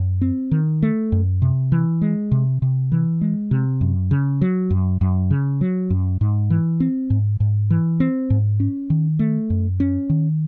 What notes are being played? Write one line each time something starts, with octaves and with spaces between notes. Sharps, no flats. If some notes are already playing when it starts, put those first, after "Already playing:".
Already playing: F#2
C4
D#3
A3
F#2
C3
E3
G#3
C3
C3
E3
G#3
C3
F#2
C#3
F#3
F#2
F#2
C#3
F#3
F#2
G#2
E3
C4
G#2
G#2
E3
C4
G#2
C#4
D#3
A3
F#2
C#4
D#3